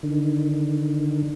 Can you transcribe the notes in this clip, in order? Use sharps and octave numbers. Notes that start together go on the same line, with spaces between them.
D3 D#3